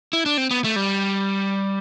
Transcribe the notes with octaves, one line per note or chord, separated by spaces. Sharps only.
E4
D4
C4
B3
A3
G3